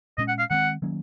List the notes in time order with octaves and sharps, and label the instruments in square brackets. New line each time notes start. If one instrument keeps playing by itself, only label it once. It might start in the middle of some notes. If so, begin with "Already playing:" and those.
[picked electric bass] A#2 G#3 C#4 [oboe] D#5
[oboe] F#5
F5
[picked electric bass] D#3 G#3 C4 [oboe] F#5
[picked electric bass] D#3 F#3 A#3 C#4